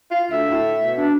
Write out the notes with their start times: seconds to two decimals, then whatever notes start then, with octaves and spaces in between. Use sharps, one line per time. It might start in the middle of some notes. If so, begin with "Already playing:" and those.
0.11 F4
0.31 D2 E5
0.49 A2
0.82 B2
0.97 D4